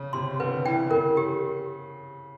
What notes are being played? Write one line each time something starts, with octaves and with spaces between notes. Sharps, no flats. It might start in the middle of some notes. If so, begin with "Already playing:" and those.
Already playing: C#3
C3 C6
D3 B4
E3 G5
C#3 A#4
G4